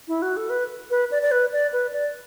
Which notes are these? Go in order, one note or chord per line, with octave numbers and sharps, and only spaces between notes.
E4
F#4
A4
B4
B4
D5
D5
B4
D5
B4
D5